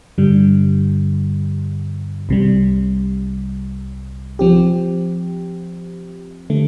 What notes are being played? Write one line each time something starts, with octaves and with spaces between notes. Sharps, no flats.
G2 D3 G3
C2 C3 G3
F3 C4 G4
D3 A3